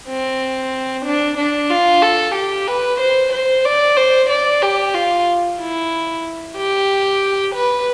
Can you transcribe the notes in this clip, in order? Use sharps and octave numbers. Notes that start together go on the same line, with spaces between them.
C4
D4
D4
F4
A4
G4
B4
C5
C5
D5
C5
D5
G4
F4
E4
G4
B4